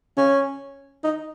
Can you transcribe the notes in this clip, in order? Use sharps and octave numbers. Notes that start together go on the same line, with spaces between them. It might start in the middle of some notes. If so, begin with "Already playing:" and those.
C#4
D#4